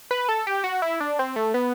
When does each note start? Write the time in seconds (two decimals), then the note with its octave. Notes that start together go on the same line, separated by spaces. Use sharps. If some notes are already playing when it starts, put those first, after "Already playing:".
0.11 B4
0.29 A4
0.47 G4
0.64 F#4
0.82 E4
1.00 D4
1.19 C4
1.36 A3
1.54 B3